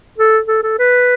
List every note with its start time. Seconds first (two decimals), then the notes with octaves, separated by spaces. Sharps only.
0.18 A4
0.48 A4
0.63 A4
0.79 B4